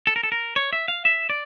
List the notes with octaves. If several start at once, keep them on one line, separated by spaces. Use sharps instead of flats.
A4
A#4
A4
A#4
C#5
E5
F5
E5
D5